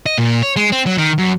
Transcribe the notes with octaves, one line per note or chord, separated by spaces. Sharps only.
D#5
A#2
C#5
G#3
C4
F#3
D#3
F#2